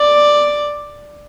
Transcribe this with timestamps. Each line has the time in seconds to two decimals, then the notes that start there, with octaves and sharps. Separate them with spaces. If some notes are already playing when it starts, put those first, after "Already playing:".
Already playing: D5